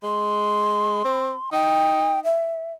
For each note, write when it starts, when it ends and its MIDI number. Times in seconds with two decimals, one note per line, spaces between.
0.03 1.03 56
0.03 1.50 84
1.05 1.33 60
1.52 2.28 63
1.52 2.20 79
2.25 2.73 76